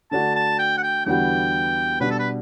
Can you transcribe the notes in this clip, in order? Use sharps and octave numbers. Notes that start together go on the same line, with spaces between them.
D3 A3 D4 F#4 A5
A5
G5
F#5
G5
E2 D3 G3 B3 F#4 G5
B2 G3 D4 F#4 B4
A4
B4